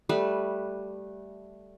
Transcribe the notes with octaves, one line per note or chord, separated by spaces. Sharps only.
G3 A3 B4